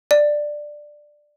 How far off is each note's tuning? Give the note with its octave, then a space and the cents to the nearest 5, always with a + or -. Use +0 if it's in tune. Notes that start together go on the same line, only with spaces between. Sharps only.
D5 +10